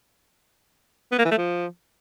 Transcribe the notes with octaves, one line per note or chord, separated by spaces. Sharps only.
B3
A#3
E3
A3
F3